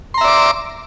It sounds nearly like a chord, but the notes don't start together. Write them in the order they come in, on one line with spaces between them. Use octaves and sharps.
C6 A#5 E5 D5 D6